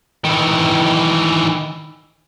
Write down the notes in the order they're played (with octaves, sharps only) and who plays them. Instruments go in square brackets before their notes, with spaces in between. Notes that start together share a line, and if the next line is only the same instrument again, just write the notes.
[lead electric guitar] D#3 E3